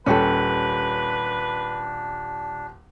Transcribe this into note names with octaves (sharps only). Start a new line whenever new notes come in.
D#1 C#4 D4 G4 A4 B4